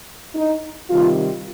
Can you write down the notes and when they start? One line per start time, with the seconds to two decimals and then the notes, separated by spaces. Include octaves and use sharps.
0.35 D#4
0.90 C3 D#3 G3 F4